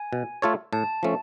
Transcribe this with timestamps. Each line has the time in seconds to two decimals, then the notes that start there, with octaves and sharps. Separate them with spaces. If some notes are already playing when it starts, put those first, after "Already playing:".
Already playing: G#5
0.13 B2
0.42 A3 F4 A4 C#5
0.73 A2 A5
1.03 F3 A3 C#4